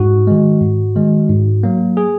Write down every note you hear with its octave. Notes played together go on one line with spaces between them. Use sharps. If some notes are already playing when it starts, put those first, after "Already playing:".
Already playing: G#2 F#4
D#3 G#3
G#2
D#3 G#3
G#2
F#3 A#3
G#4